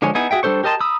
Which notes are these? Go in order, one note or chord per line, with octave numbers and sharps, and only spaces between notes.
D3 F3 G#3 C#5 G#5
B3 D#4 E4 G#4 G#5
F#4 G#4 E5 G5
G3 D4 A4 C5 C#6
G4 A#4 D#5 A5 C6
A#5 B5 D#6 E6